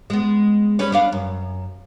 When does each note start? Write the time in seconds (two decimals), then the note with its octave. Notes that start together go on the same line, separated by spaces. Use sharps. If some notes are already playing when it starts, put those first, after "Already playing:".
0.10 G#3 B3
0.79 G3 C#4 B4
0.92 B3 D4 F5
1.12 F#2